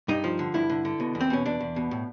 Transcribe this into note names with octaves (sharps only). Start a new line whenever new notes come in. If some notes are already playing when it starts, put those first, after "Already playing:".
G2 D#4
F3
D3
G2 E4
D3
D3
B2
E2
C4
B2 C#4
E2 D4
E2
B2
A2